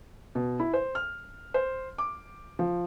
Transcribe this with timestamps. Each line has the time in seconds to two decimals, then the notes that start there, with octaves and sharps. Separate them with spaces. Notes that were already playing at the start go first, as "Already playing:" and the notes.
0.35 B2
0.60 E4
0.73 C5
0.95 F6
1.54 C5
1.98 D6
2.59 F3